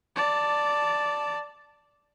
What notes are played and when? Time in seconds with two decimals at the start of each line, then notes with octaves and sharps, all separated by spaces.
0.16 D5 A5